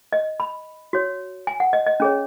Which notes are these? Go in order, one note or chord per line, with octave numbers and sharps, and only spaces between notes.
D#5
B5
F#4 C#5
G#5
F#5
D#5
D#5
C#4 G#4 C#5